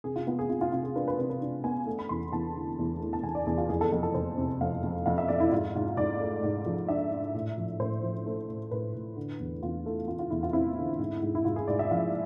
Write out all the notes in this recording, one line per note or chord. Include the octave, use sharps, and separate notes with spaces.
C3 G#4
F4
B3 F4
G#4
C3 F4
F4
C3 F4
G#4
D4 B4
B4
C3 B4
B4
D4
B3 G#5
A3
B5
E2 C6
E2 A5
D3
E2
A3
A5
E2 G#5
D5
E2 G#4
F4
F2 G#4
A4
F2 A4
A4
F2 C5
C3
F2 F5
F2
F2 F5
E5
F2 D5
E4
G#2 F4
G#2
G#2 D5
A3
G#2
F3
D4 E5
D4
A2
F3
A2 C5
F3
A3
A2
A2 B4
A2
D3
E2
E2 F4
A3
A3 F4
F4
E2 E4
F4
C4 E4
D3
G#2
G#2
E4
G#2 F4
G#4
G#2 D5
E5
F3 F5